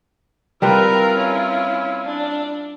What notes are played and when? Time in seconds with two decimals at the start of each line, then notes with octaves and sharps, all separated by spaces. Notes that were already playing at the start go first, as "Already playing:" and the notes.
0.62 G3 C4 E4 F4 A#4 B4
1.18 C#4
2.04 D4